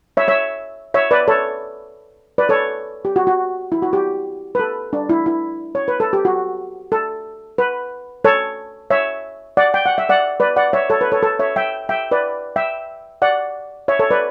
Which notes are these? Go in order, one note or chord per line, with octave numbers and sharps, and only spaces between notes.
C#5 E5
C#5 E5
C#5 E5
B4 D5
A4 C#5
B4 D5
A4 C#5
G4
F#4
F#4
E4
F#4
G4
B4
A4
D4
E4
E4
C#5
B4
A4
G4
F#4
A4
B4
A4 C#5
C#5 E5
D5 F#5
G5
F#5
E5
D5 F#5
B4 D5
D5 F#5
C#5 E5
A4 C#5
B4
A4 C#5
A4
C#5 E5
E5 G5
E5 G5
B4 D5
E5 G5
D5 F#5
C#5 E5
A4 C#5
B4 D5